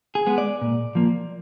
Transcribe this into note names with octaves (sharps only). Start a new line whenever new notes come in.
G#4
G#3 B3
D5
A#2
F3 A#3